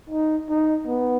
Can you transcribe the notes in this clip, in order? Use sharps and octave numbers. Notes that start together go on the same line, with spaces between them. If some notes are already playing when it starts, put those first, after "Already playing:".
D#4
D#4
B3